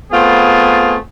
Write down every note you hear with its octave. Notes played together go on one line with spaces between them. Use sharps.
A3 B3 C4 F4 G#4